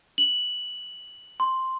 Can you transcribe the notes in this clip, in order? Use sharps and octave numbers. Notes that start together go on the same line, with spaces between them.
F#7
C6